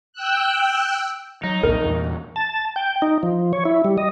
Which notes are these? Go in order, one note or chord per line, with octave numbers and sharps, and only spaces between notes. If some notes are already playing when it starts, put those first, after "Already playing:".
G5 E6 F#6
F#3 D#4
C2 F2 A#2 A#4
E2 A#2
A5
G5
D#4
F3
C#5
E4
G3
D#5